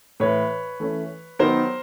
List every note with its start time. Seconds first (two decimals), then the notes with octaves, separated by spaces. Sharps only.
0.20 A2 E3 A3 B4 C#5
0.80 E3 A3 C#4
1.39 D#3 F#3 B3 D#4 A#4 C5